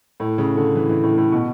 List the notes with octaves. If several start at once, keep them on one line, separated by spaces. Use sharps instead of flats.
A2
C#3
D3
E3
E3
A2
A2
B2